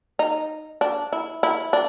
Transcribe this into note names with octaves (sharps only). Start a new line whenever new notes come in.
D#4
D4
E4
E4
D4